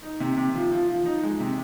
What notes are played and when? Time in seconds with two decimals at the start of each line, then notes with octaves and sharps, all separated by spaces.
0.03 D#4
0.20 C3
0.37 C3
0.55 F3
0.72 F3
0.88 F3
1.06 D#4
1.23 G#3
1.40 C3